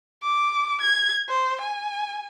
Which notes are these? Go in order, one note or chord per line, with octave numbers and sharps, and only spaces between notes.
D6
G#6
C5
G#5